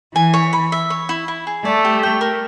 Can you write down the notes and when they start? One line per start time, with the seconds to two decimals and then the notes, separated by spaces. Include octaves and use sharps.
0.15 E3 G#5
0.34 C#5
0.53 B5
0.72 E5
0.90 C#5
1.09 E4
1.28 E4
1.47 G#4
1.65 A3 D5
1.85 G4
2.03 G5
2.21 A#4